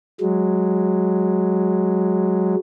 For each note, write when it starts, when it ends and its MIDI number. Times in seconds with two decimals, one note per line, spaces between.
0.21 2.55 54
0.21 2.55 56